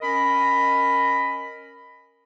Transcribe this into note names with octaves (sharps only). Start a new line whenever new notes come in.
C#4 A#4 D#5 B5